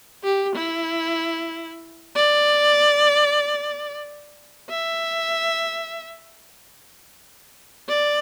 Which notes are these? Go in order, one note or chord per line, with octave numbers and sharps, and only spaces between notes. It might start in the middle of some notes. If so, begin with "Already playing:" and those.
G4
E4
D5
E5
D5